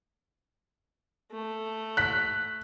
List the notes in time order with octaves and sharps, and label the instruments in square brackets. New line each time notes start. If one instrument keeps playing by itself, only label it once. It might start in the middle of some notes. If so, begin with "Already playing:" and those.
[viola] A3
[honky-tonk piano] F#6 B6